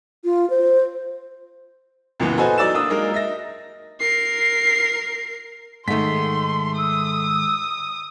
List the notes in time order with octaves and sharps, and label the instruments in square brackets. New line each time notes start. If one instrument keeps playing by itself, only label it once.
[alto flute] F4
C5
[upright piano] C#2 F#2 A#2 E3 B3
F#4 A4 B4 C5 D#5 G#5
F#3 D#4 D5 E6 A6 E7
A#3 D4 D#6 E6
F#3 G#3 A#3 D#4 A#4
D#4 E5 A#6
[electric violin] A#4 C7
[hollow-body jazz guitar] G#2 D#3 [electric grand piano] A3 B6 [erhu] C6
[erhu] D#6 [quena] E6